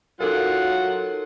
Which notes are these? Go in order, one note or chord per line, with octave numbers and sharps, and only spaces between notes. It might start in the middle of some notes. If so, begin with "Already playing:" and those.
F#3 D#4 F4 A4 A#4 F#5